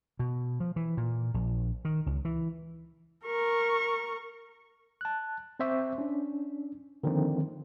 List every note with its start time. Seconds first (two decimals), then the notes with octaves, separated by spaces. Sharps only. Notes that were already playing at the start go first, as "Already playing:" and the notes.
0.19 B2
0.60 F3
0.76 E3
0.97 A#2
1.34 A#1
1.85 D#3
2.06 C#2
2.25 E3
3.25 A#4 C#6
5.01 A5 F#6
5.60 C4 C5 E5 C#6 D6
5.98 C#4 D4
7.04 D3 D#3 F3 A#3 C4